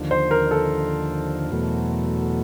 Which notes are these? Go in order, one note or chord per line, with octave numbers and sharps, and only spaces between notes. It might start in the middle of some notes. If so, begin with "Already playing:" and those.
Already playing: D#2 D3 F3
C5
A#4
A4
E2 B2 F#3 A3